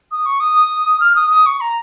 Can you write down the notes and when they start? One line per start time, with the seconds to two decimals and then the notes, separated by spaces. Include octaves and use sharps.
0.11 D#6
0.26 C#6
0.40 D#6
1.00 F6
1.16 D#6
1.30 D#6
1.46 C#6
1.61 A#5